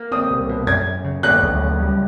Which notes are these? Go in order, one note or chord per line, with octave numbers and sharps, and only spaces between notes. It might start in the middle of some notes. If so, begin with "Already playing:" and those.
Already playing: A#3
C4 D#6
C2
B2
F#2 G#6
F#2
C#3
F#3 F#6
D2
C#3
G3